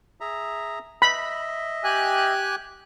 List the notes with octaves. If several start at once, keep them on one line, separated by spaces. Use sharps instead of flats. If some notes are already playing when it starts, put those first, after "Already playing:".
G#4 E5 A#5
D#5 E5 B5
G4 G#5 F#6